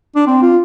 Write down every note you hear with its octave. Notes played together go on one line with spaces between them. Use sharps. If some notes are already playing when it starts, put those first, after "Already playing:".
D4
C4
F4